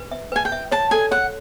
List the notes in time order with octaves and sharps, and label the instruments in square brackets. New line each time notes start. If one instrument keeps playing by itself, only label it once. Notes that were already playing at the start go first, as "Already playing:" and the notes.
Already playing: [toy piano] B4
E5
[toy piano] B4 [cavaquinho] G#5
[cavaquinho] G5
[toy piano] E5
[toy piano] C#5 [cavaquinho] A5
[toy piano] A4 [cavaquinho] G#5
[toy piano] C#5 [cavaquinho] F#5